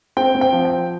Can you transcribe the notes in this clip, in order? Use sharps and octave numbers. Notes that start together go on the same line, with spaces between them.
C4 G5
C4
G5
F3
G5
F3